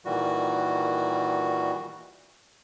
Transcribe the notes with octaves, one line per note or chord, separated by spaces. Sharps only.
A#2 D#3 E3 G3 F#4